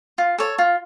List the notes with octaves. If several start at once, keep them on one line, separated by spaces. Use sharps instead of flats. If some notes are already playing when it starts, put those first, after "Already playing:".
F4
A4 C#5
F4